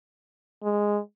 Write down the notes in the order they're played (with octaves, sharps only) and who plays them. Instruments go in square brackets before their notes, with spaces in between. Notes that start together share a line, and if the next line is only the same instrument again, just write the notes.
[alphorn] G#3